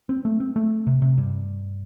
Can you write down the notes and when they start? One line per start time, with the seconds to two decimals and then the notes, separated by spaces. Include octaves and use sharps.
0.09 C4
0.25 A3
0.40 C4
0.56 A3
0.87 C3
1.02 C3
1.18 G2